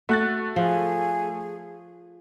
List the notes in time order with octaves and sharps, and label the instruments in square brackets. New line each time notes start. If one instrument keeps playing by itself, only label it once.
[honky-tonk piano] A3 F#6 A6 [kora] F#4
[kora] F3 [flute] G#4